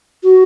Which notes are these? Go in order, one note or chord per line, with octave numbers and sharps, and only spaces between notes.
F#4